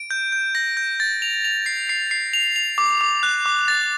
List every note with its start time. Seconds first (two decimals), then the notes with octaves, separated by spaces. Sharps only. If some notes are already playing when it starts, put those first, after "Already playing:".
Already playing: D7
0.11 G6
0.32 G6
0.55 A#6
0.77 G6
1.00 A6
1.22 F7
1.45 F7
1.66 C7
1.89 C7
2.11 C7
2.33 F7
2.56 F7
2.78 D6
3.01 D6
3.23 F#6
3.46 D6
3.68 A6